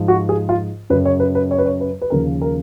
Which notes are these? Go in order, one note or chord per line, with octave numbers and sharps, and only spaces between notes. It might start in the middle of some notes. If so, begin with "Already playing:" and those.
Already playing: G#2 F3
F#4
G#4
F4
F#2 C#3 F#3 B4
C#5
B4
B4
C#5
B4
C#5
B4
B4
D#2 C#3 F3 A#4
A#4